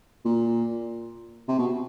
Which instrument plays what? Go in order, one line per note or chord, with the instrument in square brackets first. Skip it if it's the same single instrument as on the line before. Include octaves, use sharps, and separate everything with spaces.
[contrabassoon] A#2
C3
B2